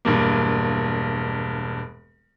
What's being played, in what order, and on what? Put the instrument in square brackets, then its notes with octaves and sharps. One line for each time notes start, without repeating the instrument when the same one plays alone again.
[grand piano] E1 G2 A#3